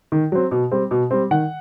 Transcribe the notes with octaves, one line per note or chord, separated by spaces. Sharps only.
D#3
F#3 C4
B2
G3 C4
B2
G3 C4
D#3 F#5